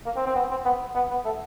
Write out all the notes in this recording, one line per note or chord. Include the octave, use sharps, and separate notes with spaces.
A#3
C4
C4
B3
C4
B3
B3
B3
A3